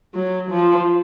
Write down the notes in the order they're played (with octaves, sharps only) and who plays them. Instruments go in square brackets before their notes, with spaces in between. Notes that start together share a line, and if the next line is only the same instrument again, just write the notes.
[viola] F#3
F3